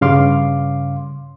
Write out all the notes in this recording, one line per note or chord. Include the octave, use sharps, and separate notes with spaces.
G2 C#3 F5 C6 D6